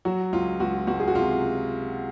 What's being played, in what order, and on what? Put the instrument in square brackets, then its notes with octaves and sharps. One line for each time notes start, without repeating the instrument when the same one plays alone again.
[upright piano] F#3 F#4
C#2 F4
C#2 F#4
C#2 F#4
G#4
F#4
C3 F4